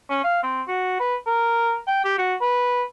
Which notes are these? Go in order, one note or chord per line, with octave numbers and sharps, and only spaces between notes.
C#4
F5
C4
F#4
B4
A#4
G5
G4
F#4
B4